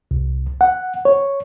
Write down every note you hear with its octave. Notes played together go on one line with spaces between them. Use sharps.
C2
F#5
C#5